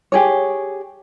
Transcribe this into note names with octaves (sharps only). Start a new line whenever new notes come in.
G4 G#4 C#5